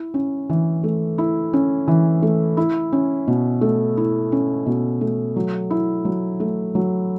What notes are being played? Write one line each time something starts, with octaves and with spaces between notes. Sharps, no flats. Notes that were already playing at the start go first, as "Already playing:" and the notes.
Already playing: E4
C#4
E3
A3
E4
C#4
E3
A3
E4
C#4
B2
A3
E4
C#4
B2
A3
F#3
E4
F#3
A3
F#3